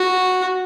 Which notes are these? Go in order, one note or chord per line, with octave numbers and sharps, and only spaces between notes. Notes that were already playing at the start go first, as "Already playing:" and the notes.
Already playing: F#4